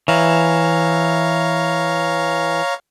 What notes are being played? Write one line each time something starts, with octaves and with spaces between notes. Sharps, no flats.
E3 C#5 F5 A#5